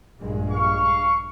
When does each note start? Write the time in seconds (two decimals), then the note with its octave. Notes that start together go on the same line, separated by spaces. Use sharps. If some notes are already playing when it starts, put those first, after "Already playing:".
0.19 A#1 G2 G#3
0.51 F5 C#6